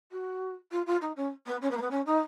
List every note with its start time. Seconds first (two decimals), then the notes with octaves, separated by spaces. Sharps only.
0.12 F#4
0.71 F4
0.86 F4
1.01 D#4
1.16 C#4
1.46 B3
1.61 C#4
1.71 B3
1.77 A#3
1.81 B3
1.91 C#4
2.06 D#4